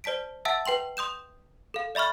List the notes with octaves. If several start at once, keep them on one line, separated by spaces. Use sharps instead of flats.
C5 D5 A5 B6 D7
E5 F#5 A5 E6
B4 G5 C6 F#7
C6 D#6 G6 E7
A4 F5
D5 E5 B5 C#6 F6